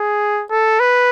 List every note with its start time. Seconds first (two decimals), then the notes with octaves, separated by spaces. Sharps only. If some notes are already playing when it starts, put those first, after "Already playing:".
Already playing: G#4
0.50 A4
0.80 B4